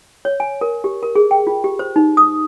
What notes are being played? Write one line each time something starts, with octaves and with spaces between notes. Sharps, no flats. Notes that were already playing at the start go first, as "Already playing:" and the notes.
C#5
G#5
A#4
G4
A#4
G#4
G5
F4
G4
C5
D#4
D#6